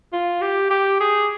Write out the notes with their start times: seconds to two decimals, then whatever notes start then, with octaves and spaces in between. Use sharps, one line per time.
0.13 F4
0.42 G4
0.71 G4
1.00 G#4